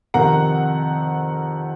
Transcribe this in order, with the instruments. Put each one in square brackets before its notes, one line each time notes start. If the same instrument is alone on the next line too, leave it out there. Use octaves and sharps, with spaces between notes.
[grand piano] F2 C3 D#3 F#5 A#5